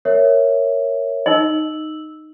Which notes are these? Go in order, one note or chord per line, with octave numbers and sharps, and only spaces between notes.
A#4 C#5 E5
D#4 D#5 E6 F#7